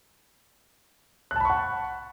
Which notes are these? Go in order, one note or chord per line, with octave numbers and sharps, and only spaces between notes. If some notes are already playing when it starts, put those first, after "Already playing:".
F#5 A5 B5 C#6 F#6